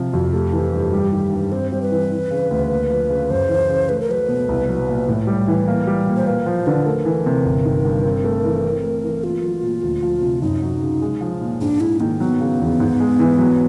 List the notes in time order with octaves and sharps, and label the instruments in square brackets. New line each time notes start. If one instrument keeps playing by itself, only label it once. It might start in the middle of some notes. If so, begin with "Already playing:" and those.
Already playing: [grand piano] C3 F3
[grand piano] F2 [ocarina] F#4
[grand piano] A3 [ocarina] G4
[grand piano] E3
G2
G3
D#3
G2
[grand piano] C4 [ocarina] C5
[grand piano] G3 [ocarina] C5
[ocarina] B4
[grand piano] E3
E3
C#3
D2
A#3
F3
C#3
[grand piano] F#2 [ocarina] C5
[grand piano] E3
C#3
[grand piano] A3 [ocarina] B4
[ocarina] A#4
[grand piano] F#3 [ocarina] B4
[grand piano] B2
C2
F#3
A#2
A2
G3
E3
A#3
G3
A#2
[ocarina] C5
[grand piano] A#3 [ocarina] B4
[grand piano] F3 [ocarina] C5
[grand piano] D3 [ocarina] B4
[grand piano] A3 [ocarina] A#4
[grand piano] E3
C3
G1
D#3
G2
C4
A3
E3
C4
A3
E3
[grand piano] A#3 [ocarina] F4
[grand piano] F#3
A#2
D2
F3
C3
[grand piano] F#2 [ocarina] D#4
[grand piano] F#3
C#3
G#3
F3
A#2
[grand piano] G#2 [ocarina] D4
[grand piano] G#3 [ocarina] E4
[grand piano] D#3 [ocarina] A#3
[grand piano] F#3 [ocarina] B3
[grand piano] C#3
E2
G#2
G#3
E3
F#3